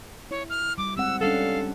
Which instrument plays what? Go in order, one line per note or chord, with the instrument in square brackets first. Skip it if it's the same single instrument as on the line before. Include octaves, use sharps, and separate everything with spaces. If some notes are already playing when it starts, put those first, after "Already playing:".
[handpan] E4 [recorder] C#5
[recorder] F6
[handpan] G3 [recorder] D6
[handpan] G#3 C4 F#5 [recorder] E6
[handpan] G3 C#4 D4 [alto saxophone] A4 [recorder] F5